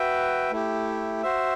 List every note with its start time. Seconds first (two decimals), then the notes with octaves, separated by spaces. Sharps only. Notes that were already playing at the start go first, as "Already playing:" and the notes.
Already playing: F#4 B4 E5 G5
0.51 A3 E4 G4
1.22 F#4 C5 E5